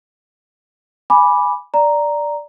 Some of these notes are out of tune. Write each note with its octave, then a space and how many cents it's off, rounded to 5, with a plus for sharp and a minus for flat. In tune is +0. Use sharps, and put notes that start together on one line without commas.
G#5 +0 B5 -10 D6 +0
D5 +0 A#5 +0